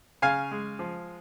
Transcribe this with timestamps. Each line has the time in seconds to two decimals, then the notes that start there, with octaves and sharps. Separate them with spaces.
0.22 C#3 F5 G#5
0.51 G#3
0.79 F3